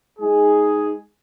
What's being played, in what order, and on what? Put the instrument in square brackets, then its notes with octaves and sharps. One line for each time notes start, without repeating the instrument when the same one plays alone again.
[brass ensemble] G#3 D#4 G#4